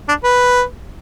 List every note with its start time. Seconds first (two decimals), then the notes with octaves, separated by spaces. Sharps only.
0.08 D4
0.24 B4